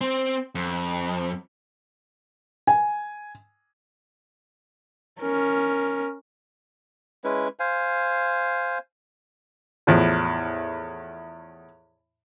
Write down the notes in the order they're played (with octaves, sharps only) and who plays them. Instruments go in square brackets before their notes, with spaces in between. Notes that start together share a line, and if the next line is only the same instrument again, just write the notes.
[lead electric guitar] C4
F2
[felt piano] G#5
[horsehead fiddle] C#4 A#4
[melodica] G#3 C#4 E4 B4
C5 F5 G#5
[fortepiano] E2 A2 F3